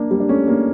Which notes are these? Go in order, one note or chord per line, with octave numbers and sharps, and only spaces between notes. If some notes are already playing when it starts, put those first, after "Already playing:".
Already playing: A#3 D4
G3 A#3
D4
A3 C#4
A#3 D4